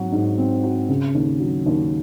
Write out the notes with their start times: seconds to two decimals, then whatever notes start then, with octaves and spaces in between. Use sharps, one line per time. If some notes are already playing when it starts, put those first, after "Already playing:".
Already playing: G#2 F#3 C4 F#4
0.12 G#2
0.38 C4
0.64 F#4
0.89 C#3
1.15 D#2
1.40 F#3
1.66 D#2